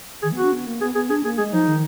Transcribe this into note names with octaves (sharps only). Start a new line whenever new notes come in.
D#3 G#4
B3
F#4
D4
B3
A#3
B3 G#4
B3 G#4
D4 G#4
A#3 G#4
G#3 G#4
F3 D#4
D#3